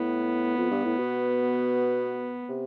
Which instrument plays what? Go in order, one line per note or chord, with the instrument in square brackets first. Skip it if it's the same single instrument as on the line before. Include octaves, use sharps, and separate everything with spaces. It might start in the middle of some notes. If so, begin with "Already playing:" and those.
Already playing: [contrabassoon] A2 [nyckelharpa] B3
[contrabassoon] F2
G2
A2
B2
C3